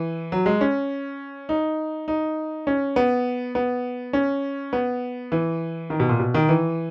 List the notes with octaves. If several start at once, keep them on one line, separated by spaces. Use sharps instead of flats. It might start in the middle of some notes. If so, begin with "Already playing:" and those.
Already playing: E3
F#3
G#3
C#4
D#4
D#4
C#4
B3
B3
C#4
B3
E3
D#3
B2
A#2
B2
D#3
E3